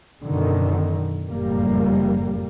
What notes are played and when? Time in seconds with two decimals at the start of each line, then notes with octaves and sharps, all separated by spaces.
0.23 F#2 B2 D3 D#3
1.29 F#1 F2 A2 G3 A#3